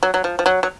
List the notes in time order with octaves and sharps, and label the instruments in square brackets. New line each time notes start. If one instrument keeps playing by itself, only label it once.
[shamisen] F#3
F#3
F3
F3
F#3
F#3